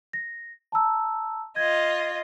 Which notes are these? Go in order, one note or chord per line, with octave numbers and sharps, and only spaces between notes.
A#6
A5 A#5 E6
F4 D#5 G#6